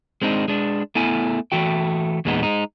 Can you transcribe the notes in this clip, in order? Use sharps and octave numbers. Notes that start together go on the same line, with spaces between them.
G#3 C4 D4 D#4
G#3 D4
A3 B3 E4 G#5
E3 A3 F#4 G5
E2 A#2 G#3 B3 D#4
G#3 D#4